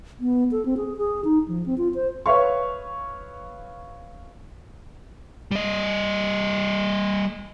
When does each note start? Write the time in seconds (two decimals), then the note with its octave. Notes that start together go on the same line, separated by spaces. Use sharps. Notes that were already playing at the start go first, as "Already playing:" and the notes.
0.20 B3
0.51 A4
0.66 C4
0.77 G#4
0.97 G#4
1.25 D#4
1.48 F3
1.66 C4
1.78 F4
1.95 C5
2.26 B4 C#5 E5 F5 C#6
5.51 G3 D#5